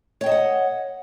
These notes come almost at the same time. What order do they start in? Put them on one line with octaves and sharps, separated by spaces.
C#5 G5 D#5 A5 F#5